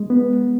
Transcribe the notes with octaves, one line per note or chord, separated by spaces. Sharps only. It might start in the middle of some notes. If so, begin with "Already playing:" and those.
Already playing: G#3
B3